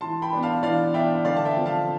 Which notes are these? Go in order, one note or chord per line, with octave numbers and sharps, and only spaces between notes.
E3 A5 C6
G5 B5
B3 D4
F5 A5
E3 D5 F5
B3 D4 E5 G5
D3 D5 F5
A5
E5 G5
F3 C4
F5 A5